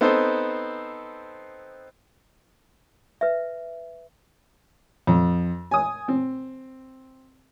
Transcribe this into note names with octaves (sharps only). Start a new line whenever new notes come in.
B3 C4 D#4 A4 C5
B4 E5
F2
G#5 D#6
C4